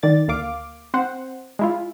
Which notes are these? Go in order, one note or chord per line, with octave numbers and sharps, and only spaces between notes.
D#3 D5 A6
D2 A#3 F5 D6
C4 C5 F#5
G#3 E4 F4